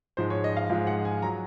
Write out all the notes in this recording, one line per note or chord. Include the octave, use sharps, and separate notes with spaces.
G#2 F3 G#3 C5
C#5
D#5
F5
G#2 F3 G#3 F5
F#5
G#5
F#3 A#5